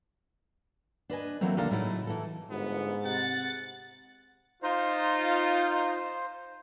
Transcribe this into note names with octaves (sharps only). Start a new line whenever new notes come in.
D4 B4 D#5 G#5
E3 F#3 A3 A#3 C4
D#2 C3 D4 A4 A#4 F5
A2 C#3 F#3 A3 D#4 E4
E3 A4
G1 G#2 B3
C3 F#5 A6
D#4 F4 C5